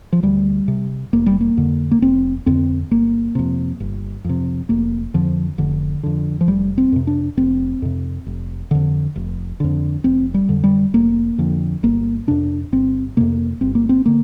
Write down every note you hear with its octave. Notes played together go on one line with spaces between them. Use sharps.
F3
D2 G3
C3
F1 A#3
G3
A#3
F2 D3
A#3
F1 C4
F2 D3 C4
G1 A#3
F2 C3
G1
F2 C3
F1 A#3
F2 D3 F3
F1 D3
F2 D3
F3
F1 G3
C4
F2 C3
D4
F1 C4
F2 C3
F1
F2 D3
F1
F2 D3
F1 C4
G3
F2 D3
G3
F1 A#3
F2 D3
G1 A#3
F2 C3 D4
G1 C4
F2 C3 A#3
G1 C4
A#3
C4
D3 A#3